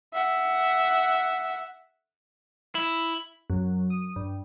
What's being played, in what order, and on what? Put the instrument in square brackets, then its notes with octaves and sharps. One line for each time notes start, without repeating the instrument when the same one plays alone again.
[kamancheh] E5 F#5
[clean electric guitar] E4
[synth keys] F#2
D#6
G2